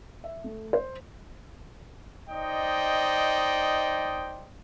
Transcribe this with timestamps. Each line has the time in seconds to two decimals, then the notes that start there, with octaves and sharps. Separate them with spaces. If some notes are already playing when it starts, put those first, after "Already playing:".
0.24 E5
0.44 A3
0.73 C5
2.30 D#4 C5 D5 D#5 G5